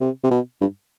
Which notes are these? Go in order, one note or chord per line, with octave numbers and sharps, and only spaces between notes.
C3
C3
B2
G2